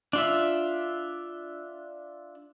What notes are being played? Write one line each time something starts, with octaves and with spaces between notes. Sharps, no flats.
D4 F4 E5